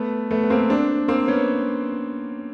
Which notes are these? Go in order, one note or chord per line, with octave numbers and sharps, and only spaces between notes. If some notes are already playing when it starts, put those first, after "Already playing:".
Already playing: A3 B3
A3 B3
B3
A#3 C4
C4 D4
A#3 C4
B3 C#4